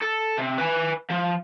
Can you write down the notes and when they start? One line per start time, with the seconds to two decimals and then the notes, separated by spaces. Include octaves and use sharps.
0.02 A4
0.38 C3
0.58 B4 G#5
1.10 F3